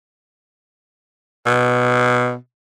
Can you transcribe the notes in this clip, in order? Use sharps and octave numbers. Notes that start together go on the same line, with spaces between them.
B2